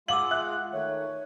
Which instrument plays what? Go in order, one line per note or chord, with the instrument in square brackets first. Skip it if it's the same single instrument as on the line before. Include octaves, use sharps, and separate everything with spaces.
[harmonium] G#3 F4 [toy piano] F5 D6 E6 [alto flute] F#5 [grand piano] F#7
[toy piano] E5 [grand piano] F#6
[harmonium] D#3 A3 [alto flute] C#5